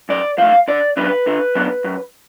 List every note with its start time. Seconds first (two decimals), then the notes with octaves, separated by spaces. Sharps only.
0.09 F#2 D5
0.38 F3 A3 F5
0.68 D3 D5
0.97 F#3 B3 D4 B4
1.27 D3
1.55 F#3 B3 D4
1.84 F#2